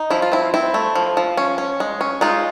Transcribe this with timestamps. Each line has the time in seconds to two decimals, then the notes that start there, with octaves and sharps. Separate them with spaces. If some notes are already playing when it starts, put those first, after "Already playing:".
Already playing: D#4
0.10 F3 E4
0.22 F4
0.32 C4 E4
0.54 C4 E4
0.74 A3
0.95 F3
1.17 F3
1.37 C#4
1.58 C#4
1.80 G#3
2.01 C#4
2.21 G#3 D#4 F4